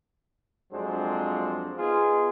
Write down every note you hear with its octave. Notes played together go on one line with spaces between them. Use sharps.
F2 F#3 G#3 D4 C5
B3 D#4 F4 G#4